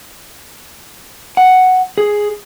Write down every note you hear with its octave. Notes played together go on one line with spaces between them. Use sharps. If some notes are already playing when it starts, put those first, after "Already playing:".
F#5
G#4